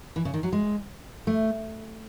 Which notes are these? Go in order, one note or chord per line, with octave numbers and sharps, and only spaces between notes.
E3
C#3
D#3
F#3
G#3
A3